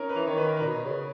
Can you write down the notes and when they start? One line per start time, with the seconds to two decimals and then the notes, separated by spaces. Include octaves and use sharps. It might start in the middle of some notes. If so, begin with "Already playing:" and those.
Already playing: C#4 D#4 A#4
0.09 B4
0.16 E3
0.27 D#3 C#5
0.37 B4
0.47 A#4
0.57 B4
0.62 A#2
0.66 B2
0.85 C#3